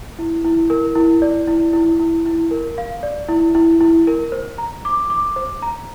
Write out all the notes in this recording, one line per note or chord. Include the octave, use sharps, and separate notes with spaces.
E4
E4
A#4
E4
D5
E4
E4
E4
E4
A#4
F5
D5
E4
E4
E4
A#4
C5
A#5
D6
D6
C5
A#5